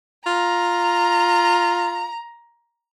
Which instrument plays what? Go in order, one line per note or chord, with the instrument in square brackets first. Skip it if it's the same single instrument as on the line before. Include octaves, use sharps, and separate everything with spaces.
[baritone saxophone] F4 [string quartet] A#5